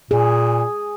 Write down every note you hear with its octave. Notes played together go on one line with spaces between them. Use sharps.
A#2 G#4